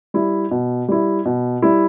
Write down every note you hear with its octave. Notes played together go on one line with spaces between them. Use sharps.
G3 E4
B2
G3 E4
B2
G3 E4